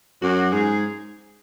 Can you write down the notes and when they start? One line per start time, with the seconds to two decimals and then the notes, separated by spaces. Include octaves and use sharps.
0.22 F#2 F#4
0.52 G#2 G#4